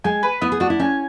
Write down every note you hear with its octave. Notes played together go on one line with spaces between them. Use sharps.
G#3 G#5
B4
B3 E4
G#4
D4 F#4
E4
C#4 G#5